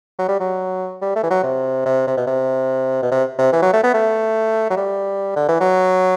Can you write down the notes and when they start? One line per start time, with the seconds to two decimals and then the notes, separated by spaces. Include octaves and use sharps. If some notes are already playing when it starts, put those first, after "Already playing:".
0.19 F#3
0.29 G3
0.40 F#3
1.02 G3
1.16 A3
1.24 E3
1.31 F#3
1.43 C3
1.86 C3
2.07 C3
2.17 B2
2.27 C3
3.02 B2
3.11 C3
3.39 C3
3.53 E3
3.62 F#3
3.73 A3
3.84 B3
3.94 A3
4.70 F#3
4.77 G3
5.36 D3
5.48 E3
5.61 F#3